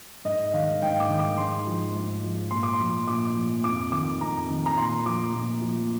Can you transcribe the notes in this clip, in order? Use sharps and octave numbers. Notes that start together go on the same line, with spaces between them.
G#2 D#5
D#3 F5
G#2 G5
D6
D#3
D6
G#2 C6
F3
G#2
F3
A#2 C6
D6
C6
F3
A#2 D6
F3
F2 D6
D#3 D6
F2 A#5
D#3
A#5
A#2 C6
F3 D6
A#2
F3